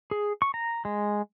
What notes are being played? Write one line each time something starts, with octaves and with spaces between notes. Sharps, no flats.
G#4
C#6
A#5
G#3